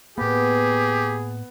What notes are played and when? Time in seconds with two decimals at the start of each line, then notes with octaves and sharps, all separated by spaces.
0.18 A2 A#3 B3 G4 G#4